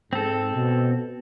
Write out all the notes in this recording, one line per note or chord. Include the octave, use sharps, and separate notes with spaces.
G#2 C4 A4
B2